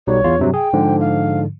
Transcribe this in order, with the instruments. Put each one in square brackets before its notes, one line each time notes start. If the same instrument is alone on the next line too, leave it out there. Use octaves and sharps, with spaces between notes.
[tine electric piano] B1 F#3 G3 [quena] C#5
[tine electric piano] E2 F4
G2 C3 F#3
[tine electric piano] G#4 [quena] G5
[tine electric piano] G#2 D3 F3
[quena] F5